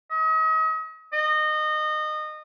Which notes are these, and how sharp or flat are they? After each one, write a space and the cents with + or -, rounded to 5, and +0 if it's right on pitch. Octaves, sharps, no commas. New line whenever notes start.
D#5 +40
D#5 -25